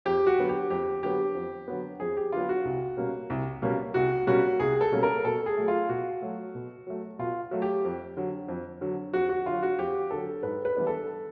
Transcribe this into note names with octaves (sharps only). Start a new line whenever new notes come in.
F2 G4
F#4
D3 F#3 B3
G4
F2 G4
D3 F#3 B3 G4
F2
D3 F#3 B3
F2 G#4
G4
D3 F#3 B3 F4
F#4
C2
B2 G3 A#3 C#4
C2
B2 G3 A#3 C#4
C2 F#4
B2 G3 A#3 C#4 F#4
C2 G#4
A4
B2 G3 A#3 C#4
A#4
B2 A4
G#4
F#3 A3
F4
B2 F#4
F#3 A3
B2
F#3 A3
B2 F4
F#3 A3
G4
F2
D3 F#3
F2
D3 F#3
F2 F#4
F#4
D3 F#3 F4
F#4
F2 G4
D3 F#3 A4
G#2 B4
B4
E3 G3 B3 D4
A4